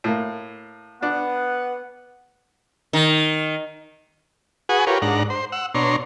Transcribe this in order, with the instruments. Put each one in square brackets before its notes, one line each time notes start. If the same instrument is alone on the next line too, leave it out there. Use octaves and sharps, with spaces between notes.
[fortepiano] A2 A#3
[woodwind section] B3 F#5 [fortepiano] D4
[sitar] D#3
[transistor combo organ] F#4 G#4 B4 F#5 G#5
F4 G4 A#4 B4 C#5
G#2 D4 F#5 A#5
C5
F#5 E6
B2 D4 C#5 A#5 C6